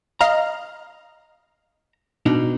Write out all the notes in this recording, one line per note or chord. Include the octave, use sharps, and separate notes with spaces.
D#5 F5 A#5 F6
B2 D4 D#4